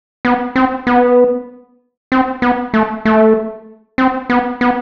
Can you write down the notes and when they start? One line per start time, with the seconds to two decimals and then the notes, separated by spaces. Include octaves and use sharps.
0.25 B3
0.56 C4
0.87 B3
2.12 C4
2.42 B3
2.74 A3
3.05 A3
3.98 C4
4.30 B3
4.61 B3